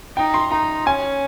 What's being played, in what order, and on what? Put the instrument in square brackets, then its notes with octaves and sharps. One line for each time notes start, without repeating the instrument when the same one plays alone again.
[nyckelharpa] D#4 [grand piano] G5
[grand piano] C6
[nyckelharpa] D#4 [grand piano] A#5
[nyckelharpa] C#4 [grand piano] G#5